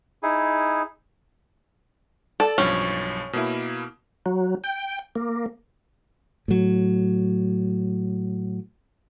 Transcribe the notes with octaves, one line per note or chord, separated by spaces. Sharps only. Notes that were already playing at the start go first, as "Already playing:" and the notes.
D#4 E4 G#4
A4 D5
B1 G2 F3 C#4
B2 A#3 E4
F#3
G5
A#3
A2 F#3